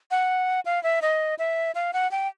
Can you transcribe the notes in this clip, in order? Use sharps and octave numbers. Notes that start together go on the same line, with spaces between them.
F#5
F5
E5
D#5
E5
F5
F#5
G5